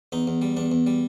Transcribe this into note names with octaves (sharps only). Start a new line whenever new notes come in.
E2 D#4
E2
G3
E2 D4
E2
G3